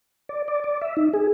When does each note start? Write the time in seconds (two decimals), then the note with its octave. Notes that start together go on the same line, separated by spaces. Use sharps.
0.29 D5
0.48 D5
0.64 D5
0.81 E5
0.97 D#4
1.13 G#4